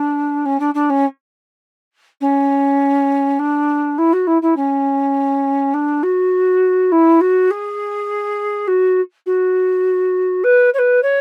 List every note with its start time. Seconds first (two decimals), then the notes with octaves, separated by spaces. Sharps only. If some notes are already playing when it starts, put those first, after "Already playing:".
Already playing: D4
0.45 C#4
0.60 D4
0.74 D4
0.90 C#4
2.21 C#4
3.39 D4
3.98 E4
4.13 F#4
4.27 E4
4.42 E4
4.56 C#4
5.74 D4
6.03 F#4
6.92 E4
7.21 F#4
7.51 G#4
8.67 F#4
9.26 F#4
10.44 B4
10.74 C#5
10.78 B4
11.03 C#5